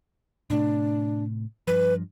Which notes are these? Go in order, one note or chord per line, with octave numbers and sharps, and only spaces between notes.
A2 C3 A3 D4
G2 F3 B4